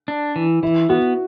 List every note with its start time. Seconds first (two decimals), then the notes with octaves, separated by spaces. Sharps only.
0.08 D4
0.36 E3
0.63 E3 E4
0.89 B3 F#4